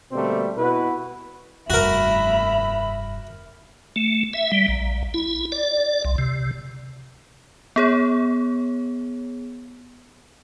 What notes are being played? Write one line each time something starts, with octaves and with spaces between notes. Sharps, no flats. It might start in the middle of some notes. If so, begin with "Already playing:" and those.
B2 D3 G3 A3 A#3 C4
B2 E4 F#4 B4
F1 G2 F#4 A#4 E5 B5
A3
E5
G3
A#1
E4
D5
C2
C3
B3 G#4 C#5